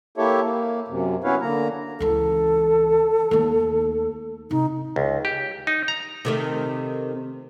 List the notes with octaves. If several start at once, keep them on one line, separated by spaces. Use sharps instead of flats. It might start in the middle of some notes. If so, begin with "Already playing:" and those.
A#3 E4 G4 A4 C#5 E5
A#3
F#2 C3
B3 C#4 E4 B4 C#5 F5
D3 A#3 A#5
C#2 E3 A4
D#2 A3
C3 D#4
C#2
G4
D#4
A#5
C3 D#3 A3